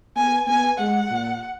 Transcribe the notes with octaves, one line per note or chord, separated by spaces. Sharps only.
B3 G#5
B3 G#5
G#3 F#5
A#2